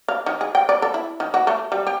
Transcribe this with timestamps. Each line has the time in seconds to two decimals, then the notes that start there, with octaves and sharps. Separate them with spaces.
0.08 F5
0.26 D#3
0.41 G#4
0.55 G5
0.69 D5
0.82 A4
0.94 E4
1.20 D#3
1.34 F#4
1.47 A3
1.72 G3
1.87 G4